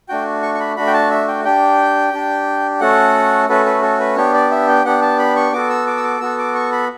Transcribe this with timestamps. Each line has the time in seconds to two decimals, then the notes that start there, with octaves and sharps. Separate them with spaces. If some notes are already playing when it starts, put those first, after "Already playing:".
0.08 A3 D4 F#4 G5
0.43 C#6
0.54 C#6
0.60 B5
0.76 A3 D4 F#4 B5
0.87 G5
0.94 A5
1.10 E5
1.28 G5
1.45 D4 G4 G5
2.13 D4 G4
2.80 A3 C#4 F#4 A4 F#5
3.49 A3 C#4 F#4 A4 B4
3.66 B4
3.82 A4
4.00 B4
4.17 B3 D4 G4 C#5
4.34 D5
4.51 E5
4.68 G5
4.85 B3 D4 G4 F#5
5.02 A5
5.19 B5
5.36 C#6
5.53 B3 F#4 A4 D6
5.69 E6
5.87 D6
5.97 E6
6.04 D6
6.21 B3 F#4 A4 E6
6.38 D6
6.55 C#6
6.72 B5